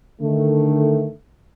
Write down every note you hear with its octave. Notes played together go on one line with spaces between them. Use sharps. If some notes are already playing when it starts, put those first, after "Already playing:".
D3 D#3 A3